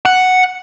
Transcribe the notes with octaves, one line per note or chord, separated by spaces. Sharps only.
F#5